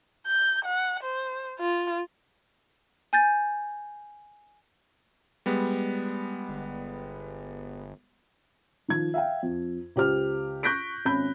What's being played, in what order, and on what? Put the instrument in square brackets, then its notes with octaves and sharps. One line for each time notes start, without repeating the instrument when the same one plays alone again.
[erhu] G6
F#5
C5
F4
[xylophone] G#5 G6 A6
[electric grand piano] G3 G#3 B3
[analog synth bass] G1
[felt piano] D#3 F3 G#6
E5 F5 G5
F2
C#2 G4 C5 F6
C#6 F#6 G6 A#6 B6 D7
G#1 C#4 B5 G6